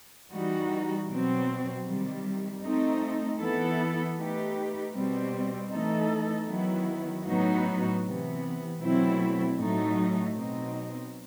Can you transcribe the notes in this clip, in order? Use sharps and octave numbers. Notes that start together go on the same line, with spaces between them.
E3 G3 D#4 F#4
B2 F#3 C4
C3 D#3 G3
A3 C4 D#4
E3 B3 E4 A4
A3 D#4 G4 B4
B2 G3 C4
E3 A3 D#4 A4
D#3 F#3 B3 E4
A2 F#3 B3 D#4 F#4
C3 E3 B3
B2 F#3 A3 C4 E4
A2 F#3 A3 D#4
B2 F#3 C4 D#4